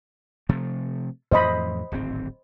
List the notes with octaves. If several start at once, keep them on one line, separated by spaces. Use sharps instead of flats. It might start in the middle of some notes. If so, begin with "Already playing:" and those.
C3 F3 A3
F2 A2 E3 C5 D#5 B5
D1 G#1 C4